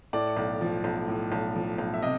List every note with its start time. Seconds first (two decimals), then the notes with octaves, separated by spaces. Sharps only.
0.13 A2 D5
0.37 B1
0.61 F3
0.84 B1
1.08 A2
1.32 B1
1.56 F3
1.78 B1
1.94 E5
2.02 C3 D#5